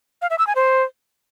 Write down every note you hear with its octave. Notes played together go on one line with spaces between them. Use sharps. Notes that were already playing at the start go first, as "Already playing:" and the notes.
F5
E5
E6
G#5
C5